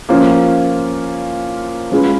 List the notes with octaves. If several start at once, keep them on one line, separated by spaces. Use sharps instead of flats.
F3 A#3 C#4 F4
G#3 C#4 F4 G#4 B4